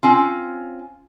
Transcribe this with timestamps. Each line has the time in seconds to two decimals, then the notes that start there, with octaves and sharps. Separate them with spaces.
0.03 C4 C#4 F4